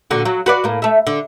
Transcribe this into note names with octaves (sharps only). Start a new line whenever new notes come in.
A#2 D3 F#4
F#3
F#4 B4 D5
A2 A#3
A3 E5
D3